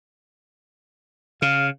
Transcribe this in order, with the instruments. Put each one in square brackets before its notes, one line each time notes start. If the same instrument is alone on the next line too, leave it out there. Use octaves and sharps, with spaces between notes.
[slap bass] C#3 [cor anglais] F5